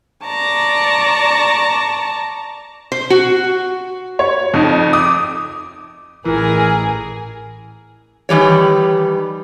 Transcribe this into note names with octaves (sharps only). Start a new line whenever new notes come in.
D5 A5 A#5 C#6
C5
F#4
C#5
F2 D#4
D6 D#6
A1 E3 G#4 A#4
D#3 E3 G3 C#5